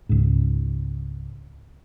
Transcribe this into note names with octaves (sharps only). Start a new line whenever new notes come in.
C#2 G#2